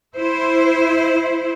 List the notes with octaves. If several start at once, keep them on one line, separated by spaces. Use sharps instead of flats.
E4 C5